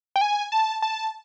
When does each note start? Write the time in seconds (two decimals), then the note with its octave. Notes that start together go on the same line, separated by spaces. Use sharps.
0.16 G5
0.21 G#5
0.52 A5
0.82 A5